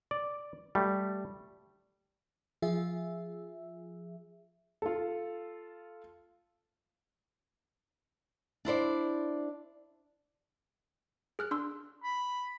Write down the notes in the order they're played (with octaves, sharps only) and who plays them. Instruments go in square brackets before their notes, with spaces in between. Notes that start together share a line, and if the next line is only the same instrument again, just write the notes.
[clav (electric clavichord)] D5
G3 A3
[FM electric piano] F3 F4 G#4 E5
[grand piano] F4 A4
[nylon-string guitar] D4 E4 C5 D5
[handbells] G#4 F6 F#6
D4 C6 E6
[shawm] B5